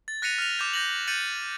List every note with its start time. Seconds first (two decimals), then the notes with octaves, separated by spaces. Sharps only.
0.08 A6
0.22 F#6 A#6 B6 C#7 D#7 F7
0.38 F6 F7
0.59 D6 G6
0.73 G6 A#6 F#7
1.07 G6 A6 C#7 D#7 F#7